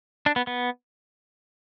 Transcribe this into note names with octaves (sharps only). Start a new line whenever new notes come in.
D4
B3
B3